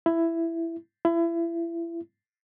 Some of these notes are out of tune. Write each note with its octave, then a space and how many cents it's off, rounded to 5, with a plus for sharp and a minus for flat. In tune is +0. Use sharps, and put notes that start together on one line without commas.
E4 +10
E4 +30